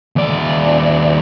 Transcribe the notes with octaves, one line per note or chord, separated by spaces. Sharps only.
D#2 D5